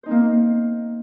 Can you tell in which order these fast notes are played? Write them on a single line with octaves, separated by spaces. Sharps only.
C5 D#4 C4 A#3